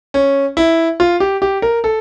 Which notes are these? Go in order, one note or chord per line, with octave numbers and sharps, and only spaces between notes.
C#4
E4
F4
G4
G4
A#4
A4